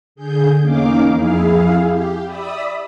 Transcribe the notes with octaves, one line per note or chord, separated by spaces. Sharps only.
D3 G#4 G6
E2 A#3 C#4 D#4 F5 D6
F2 E4 G#4 F5
G4
D5 E5 B5 D#6